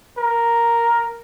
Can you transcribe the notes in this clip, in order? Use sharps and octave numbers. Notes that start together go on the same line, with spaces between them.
A#4